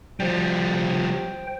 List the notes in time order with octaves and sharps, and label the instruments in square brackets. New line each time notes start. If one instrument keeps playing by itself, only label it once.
[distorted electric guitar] F3 G3 [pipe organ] C5 G5